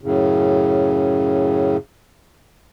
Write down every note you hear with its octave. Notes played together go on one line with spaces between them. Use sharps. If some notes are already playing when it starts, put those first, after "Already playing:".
F#2 A2 C#3